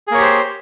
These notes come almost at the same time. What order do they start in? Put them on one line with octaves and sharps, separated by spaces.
G#4 A#3 C#5 G4 C5